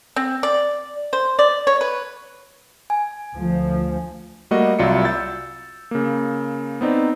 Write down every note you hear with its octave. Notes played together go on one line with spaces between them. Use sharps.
C4
D5
C5
D5
C#5
B4
G#5
D2 F3
G3 A3 A#3 F#4 D#5 F#5
C2 F#3 F4 D5 E5 C#7
E6 G6 A6
C#3 A#3
B3 C4 D#4 D5